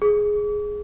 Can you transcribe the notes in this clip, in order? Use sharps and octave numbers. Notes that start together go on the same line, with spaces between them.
G#4